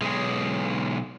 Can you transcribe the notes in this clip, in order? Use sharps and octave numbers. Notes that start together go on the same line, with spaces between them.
B1 G#3